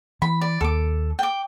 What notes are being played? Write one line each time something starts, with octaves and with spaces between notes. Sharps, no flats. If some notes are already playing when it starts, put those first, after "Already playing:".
E3 B5
D5
D#2 A#3 A4 D6
G5 D6